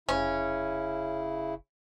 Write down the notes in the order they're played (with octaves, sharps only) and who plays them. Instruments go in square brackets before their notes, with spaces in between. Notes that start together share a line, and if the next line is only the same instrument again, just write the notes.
[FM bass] F1 [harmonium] C#3 E4 [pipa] C#4